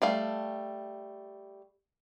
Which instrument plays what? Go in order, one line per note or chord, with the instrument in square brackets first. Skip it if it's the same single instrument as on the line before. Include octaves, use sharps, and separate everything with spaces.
[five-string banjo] G3 A3 F5